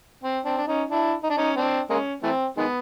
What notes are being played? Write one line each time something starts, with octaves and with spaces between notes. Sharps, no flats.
C4
C4 D4
D4
C#4 D#4
D4 E4
D#4
D4
C#4 D#4
C4 D4
G#3 A#3 C#4
E3 A3 C4
D#3 G#3 B3